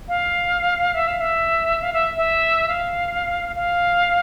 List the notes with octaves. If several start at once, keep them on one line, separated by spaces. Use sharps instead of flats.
F5
E5
F5
E5
F5
E5
E5
F5
F5